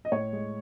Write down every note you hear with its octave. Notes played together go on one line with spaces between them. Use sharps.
D#5
A2 C#5
G#3